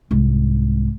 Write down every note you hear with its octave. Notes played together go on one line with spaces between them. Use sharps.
C2 G#2